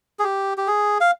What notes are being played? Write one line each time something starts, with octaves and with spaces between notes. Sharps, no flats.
G#4
G4
G4
G#4
F5